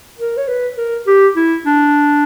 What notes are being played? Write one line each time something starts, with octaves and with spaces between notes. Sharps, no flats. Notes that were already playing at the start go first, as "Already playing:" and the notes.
A#4
C#5
B4
A#4
G4
E4
D4